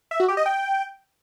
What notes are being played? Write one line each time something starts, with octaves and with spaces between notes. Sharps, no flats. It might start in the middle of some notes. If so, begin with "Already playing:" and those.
E5
F#4
G4
D#5
G5